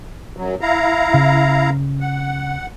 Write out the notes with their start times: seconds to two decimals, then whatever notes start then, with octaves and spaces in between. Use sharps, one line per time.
0.37 F#2 F#3
0.61 E4 F5 A#5
1.14 C#3
2.00 F#5